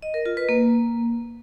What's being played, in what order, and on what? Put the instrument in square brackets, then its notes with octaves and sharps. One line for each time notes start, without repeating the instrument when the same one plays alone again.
[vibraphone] D#5
A#4
F4
B4
A#3